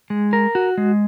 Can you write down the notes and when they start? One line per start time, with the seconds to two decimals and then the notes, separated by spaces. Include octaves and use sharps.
0.10 G#3
0.33 A#4
0.55 F#4
0.78 G#3